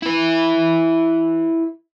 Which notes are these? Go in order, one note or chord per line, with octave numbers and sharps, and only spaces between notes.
E4 B4